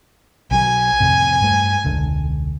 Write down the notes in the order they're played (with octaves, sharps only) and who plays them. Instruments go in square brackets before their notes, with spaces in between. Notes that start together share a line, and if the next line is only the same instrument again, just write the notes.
[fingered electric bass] B1 D#3 F#3 [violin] G#5
[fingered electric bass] F2 A2 C3
G2 A3
E1 C#2 D3